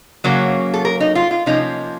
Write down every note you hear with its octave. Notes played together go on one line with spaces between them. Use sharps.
C#3 F#3 A#3 C#4
A4
A#4
D#4
F4
F4
C3 F3 A#3 C#4 D#4